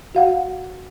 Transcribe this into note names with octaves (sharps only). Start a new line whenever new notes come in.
F#4 F5 F#5